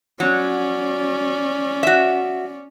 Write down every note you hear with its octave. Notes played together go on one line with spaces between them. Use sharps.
F#3 C#4 D5
F#4 E5